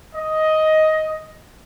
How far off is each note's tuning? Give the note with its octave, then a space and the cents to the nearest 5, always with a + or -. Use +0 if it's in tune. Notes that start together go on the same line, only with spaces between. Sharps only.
D#5 +10